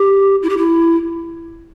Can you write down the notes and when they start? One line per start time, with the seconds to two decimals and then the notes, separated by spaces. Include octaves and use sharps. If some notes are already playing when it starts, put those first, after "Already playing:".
Already playing: G4
0.43 E4
0.49 G4
0.58 E4